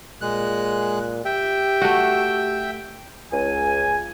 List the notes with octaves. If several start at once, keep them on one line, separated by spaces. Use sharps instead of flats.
A#2 G#3 F#6
G4 E5 G5
A3 F#4
C#2 G#5